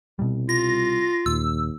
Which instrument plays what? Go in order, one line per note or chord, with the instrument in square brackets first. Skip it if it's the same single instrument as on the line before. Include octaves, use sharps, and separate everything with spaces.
[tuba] C2 [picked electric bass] B2 G3
[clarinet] F4 [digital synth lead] A#6
[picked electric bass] D#1 [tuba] D#2 [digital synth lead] E6